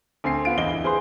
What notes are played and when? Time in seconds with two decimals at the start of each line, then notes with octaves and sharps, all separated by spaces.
0.24 D2 C4 G#5 C7
0.45 B3 F4 D7
0.58 G1 E2 D#5 G7
0.71 E4
0.84 G#4 B4 C5 C6